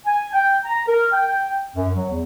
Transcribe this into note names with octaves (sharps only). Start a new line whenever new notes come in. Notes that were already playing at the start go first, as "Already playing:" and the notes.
G#5
G5
A#5
A#4
G5
F#2
F#3
E2